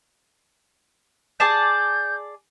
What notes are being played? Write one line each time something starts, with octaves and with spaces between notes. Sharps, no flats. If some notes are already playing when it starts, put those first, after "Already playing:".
G#4 D5 A5 G6